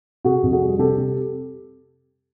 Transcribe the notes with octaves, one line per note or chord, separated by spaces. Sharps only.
C3 F#4 G#4
F2
F#4 G#4
G3
C3 G4 A4
C3